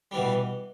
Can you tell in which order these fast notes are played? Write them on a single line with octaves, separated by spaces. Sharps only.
G3 E3 B2